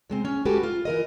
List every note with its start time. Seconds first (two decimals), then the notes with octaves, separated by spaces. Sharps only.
0.10 C3 G#3 C4
0.25 C#4
0.45 G#3 C#4 F#4 G4 A4 B4
0.63 F4
0.85 E3 A#4 D#5